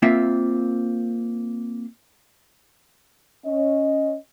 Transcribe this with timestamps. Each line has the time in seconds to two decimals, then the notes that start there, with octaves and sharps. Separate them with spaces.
0.02 A#3 C4 F4 E5
3.45 C#4 D#5